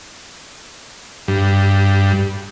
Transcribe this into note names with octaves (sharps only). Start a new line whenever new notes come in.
G2